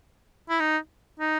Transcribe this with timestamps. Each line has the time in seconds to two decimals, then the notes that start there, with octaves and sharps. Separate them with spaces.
0.49 E4
0.60 D#4
1.20 D#4